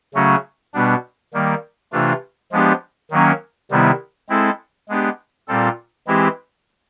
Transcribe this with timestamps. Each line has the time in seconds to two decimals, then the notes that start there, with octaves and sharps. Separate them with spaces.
0.14 C#3 F#3 A3 C#4 F#4
0.74 B2 G3 B3 D4
1.34 D#3 G3 A#3
1.92 C3 E3 A3 D4 F4
2.52 F3 G#3 B3 D4 G4
3.11 D#3 F#3 A#3 C#4
3.71 C3 D#3 G3 B3 E4
4.29 G#3 C4 E4 A4
4.89 G#3 B3 D4 G4
5.48 A#2 G3 C4 F4 A4
6.07 E3 G#3 C4 E4 G4